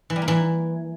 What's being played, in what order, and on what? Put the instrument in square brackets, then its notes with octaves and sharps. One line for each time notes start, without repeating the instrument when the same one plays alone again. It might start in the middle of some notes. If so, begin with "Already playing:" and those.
[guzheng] E3
G3
A#3
E3